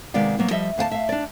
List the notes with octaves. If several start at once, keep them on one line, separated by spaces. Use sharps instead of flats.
C3 D#3 G#3 B3 D5 F5
F#3 A#3 B3
F3 G3 D#5 E5
D2 F5 F#5 A5
E5 F5
D4 D5